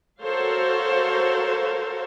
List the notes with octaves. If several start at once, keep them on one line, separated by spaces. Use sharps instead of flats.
F#4 A4 A#4 C5 C#5 F5